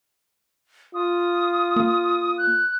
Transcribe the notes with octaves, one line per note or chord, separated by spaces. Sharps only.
F4 D#6
A#3
F#6